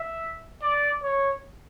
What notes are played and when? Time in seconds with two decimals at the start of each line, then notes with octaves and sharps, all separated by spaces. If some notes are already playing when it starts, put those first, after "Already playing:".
Already playing: E5
0.62 D5
1.02 C#5